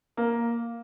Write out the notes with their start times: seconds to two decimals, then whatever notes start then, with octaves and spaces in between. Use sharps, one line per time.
0.17 A#3